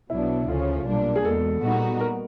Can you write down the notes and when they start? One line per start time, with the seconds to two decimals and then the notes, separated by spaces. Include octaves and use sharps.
0.10 B1 B2 F#3 B3 D4 E4
0.48 D2 C#3 F3 A3 C#4 F4
0.86 B1 A#2 G3 A#3 D4
1.16 G#4
1.24 E2 B2 G#3 A4
1.63 A#2 G3 B3 D#4 F#4
2.00 A#4